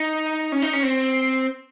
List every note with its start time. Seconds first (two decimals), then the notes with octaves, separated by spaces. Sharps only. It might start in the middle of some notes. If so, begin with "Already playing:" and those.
Already playing: D#4
0.52 C#4
0.62 D#4
0.73 C#4
0.83 C4